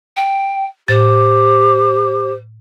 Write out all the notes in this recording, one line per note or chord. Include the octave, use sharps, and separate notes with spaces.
G5
A2 G4 C5 A6